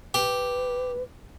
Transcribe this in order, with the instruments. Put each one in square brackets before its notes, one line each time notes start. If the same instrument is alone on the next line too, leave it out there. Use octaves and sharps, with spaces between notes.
[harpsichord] G4 [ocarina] B4